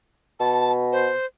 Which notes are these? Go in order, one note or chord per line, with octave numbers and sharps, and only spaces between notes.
B2 A5
C5